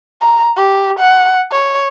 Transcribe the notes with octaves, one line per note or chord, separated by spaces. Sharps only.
A#5
G4
F#5
C#5